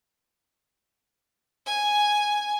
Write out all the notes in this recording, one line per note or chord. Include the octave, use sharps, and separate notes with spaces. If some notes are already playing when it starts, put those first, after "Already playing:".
G#5